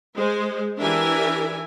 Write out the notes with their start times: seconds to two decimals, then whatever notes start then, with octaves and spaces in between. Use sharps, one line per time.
0.16 G#3 C5
0.80 E3 D4 G4 A#4 E5 G#5